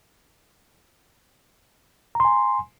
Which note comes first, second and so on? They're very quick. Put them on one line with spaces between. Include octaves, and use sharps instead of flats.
A#5 C6 G#5